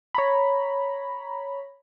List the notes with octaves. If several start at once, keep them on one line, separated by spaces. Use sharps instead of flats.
C#5 A#5 B5